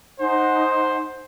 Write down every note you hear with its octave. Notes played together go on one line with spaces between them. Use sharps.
D#4 C5 F#5 G#5